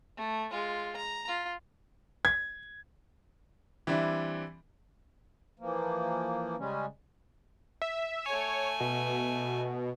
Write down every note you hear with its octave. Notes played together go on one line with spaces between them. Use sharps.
A3
G#3 F4
A#5
F4
G#6
E3 G3 C4 D4 E4
E3 F3 A#3
C#3 G3 G#3 C#4
E5
A3 C#5 G#5
B2